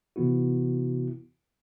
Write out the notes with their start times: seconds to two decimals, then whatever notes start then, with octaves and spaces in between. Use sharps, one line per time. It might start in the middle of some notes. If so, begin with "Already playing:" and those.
0.16 C3 E3 B3 E4 F#4